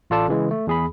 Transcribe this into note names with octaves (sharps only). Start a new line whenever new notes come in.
A1 F4 A4 D5 A5
C#3 E3 G#3
A3
E2 G#4 B5